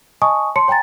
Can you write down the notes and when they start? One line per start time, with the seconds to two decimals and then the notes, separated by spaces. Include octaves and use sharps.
0.22 D#5 G#5 A5 C#6 D#6
0.56 C#5 A5 C6 C#7
0.68 C#5 G5 G#5 A#5 A6